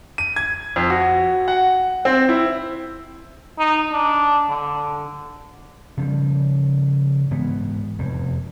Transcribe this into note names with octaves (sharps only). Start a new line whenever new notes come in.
D#7
G#6
F2
F#4
F#5
C4
E4
D#4
D4
D3
C#3 F3 G3
G#2 E3 B3
F1 E2